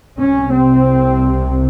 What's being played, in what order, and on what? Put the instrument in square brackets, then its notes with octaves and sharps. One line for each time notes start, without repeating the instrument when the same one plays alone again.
[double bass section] C2 C3 C#4
C4